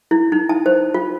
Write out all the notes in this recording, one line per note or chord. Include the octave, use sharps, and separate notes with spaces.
E4
D#4
A5
C5
F4